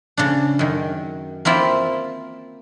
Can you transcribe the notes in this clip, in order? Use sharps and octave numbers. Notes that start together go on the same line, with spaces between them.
C#3 D4
F#2 D#3
A#3 C4 E4 F4